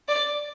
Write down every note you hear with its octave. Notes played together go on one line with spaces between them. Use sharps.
D5